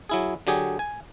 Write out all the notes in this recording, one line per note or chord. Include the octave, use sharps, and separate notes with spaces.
F#3 E4 G#4
D3 F#3 G4 G#4
G#5